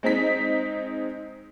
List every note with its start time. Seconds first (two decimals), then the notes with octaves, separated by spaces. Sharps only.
0.03 G#3 C4 D#4 B6